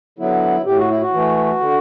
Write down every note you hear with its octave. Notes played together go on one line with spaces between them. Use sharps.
D3 F#3 B3 E4
A2 G4
F#4
E4
F#4
E3 A3
D3